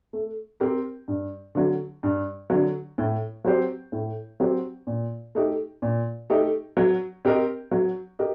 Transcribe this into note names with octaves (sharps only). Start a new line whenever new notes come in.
A3
C4 G4 A#4
G2
D3 F#3
G2
D3 F#3
A2
F#3 C4 G4 C5
A2
F#3 C4 G4 C5
A#2
A3 D#4 G4
A#2
A3 D#4 G4
F#3
C4 G4 A#4 D#5
F#3
G4 A#4 D#5